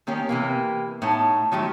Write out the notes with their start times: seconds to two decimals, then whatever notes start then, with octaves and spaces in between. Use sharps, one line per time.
0.07 D#3 A#3 C#4 G4
0.29 C3 E3 A#3
1.02 A2 D#4 A5
1.52 D#3 F#3 A3 F4 G4